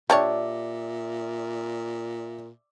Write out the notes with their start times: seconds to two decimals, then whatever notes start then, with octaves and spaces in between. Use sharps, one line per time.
0.10 A#2 G3 D4 C#5 D5 E5